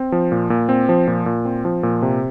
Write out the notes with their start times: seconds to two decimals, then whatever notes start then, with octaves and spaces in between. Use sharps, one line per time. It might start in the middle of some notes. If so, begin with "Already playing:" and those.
Already playing: C4
0.12 F3
0.32 A#2
0.50 A#2
0.69 C4
0.89 F3
1.07 A#2
1.26 A#2
1.45 C4
1.65 F3
1.83 A#2
2.02 C3